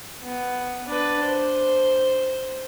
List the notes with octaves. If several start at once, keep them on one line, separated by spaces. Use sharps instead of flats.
B3
D4 B4
C5